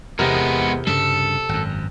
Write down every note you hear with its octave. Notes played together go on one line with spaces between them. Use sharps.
E2 C3 G#3 B3 A#4
G2 C#3 G3 A4
G#1 F#2